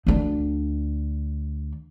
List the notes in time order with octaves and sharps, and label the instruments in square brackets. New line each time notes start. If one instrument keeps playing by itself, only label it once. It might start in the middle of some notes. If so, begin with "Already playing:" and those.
[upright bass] D2 D4